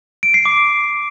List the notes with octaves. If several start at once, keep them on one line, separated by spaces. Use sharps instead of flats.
D7
C7
D6